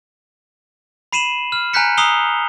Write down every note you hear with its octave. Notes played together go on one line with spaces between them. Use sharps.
B5 C7 D#7 E7 F#7
F6
G#5 A#5 F#6 G6 B6 C#7
A#5 D#6 E6 C7 F7 G7